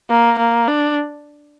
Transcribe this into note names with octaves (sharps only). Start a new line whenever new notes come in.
A#3
A#3
D4